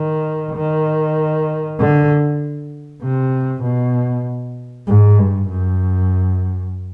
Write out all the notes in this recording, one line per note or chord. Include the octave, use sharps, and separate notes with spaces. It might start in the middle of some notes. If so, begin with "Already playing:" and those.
Already playing: D#3
D#3
D3
C3
B2
G#2
G2
F#2